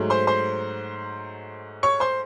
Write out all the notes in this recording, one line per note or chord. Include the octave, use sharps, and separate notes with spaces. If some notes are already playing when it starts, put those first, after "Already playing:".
Already playing: G#2 F#3 A3
C5 C6
C5 C6
C#5 C#6
C5 C6